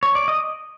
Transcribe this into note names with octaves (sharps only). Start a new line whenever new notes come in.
C#5
D5
D#5